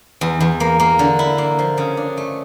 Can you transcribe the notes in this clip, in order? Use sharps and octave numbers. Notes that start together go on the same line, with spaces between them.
E2
E2
A#3
A#3
D3
E4
A#3
F3
C#3
D4
A3